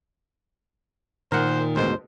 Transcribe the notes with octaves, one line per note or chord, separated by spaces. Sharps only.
A#2 D#3 A#4 C5 F#5
D2 G#2 B2 C5